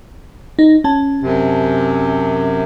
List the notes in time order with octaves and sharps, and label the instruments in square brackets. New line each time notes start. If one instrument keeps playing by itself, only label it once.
[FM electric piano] D#4
C#4 A5
[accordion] F#2 C3